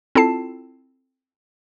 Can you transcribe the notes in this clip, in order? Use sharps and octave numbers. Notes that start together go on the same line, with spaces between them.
C4 E4 F4 A4 A5 C7